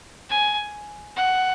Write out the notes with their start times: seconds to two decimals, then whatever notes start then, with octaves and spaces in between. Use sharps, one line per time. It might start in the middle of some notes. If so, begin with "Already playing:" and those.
0.30 G#5
1.16 F#5